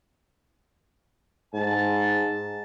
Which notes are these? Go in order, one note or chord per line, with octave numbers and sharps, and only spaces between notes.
G#2 A5